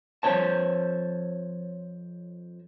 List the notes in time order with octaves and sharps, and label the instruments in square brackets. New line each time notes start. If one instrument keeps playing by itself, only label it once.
[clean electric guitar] F2 G#3 C5 C#5 A5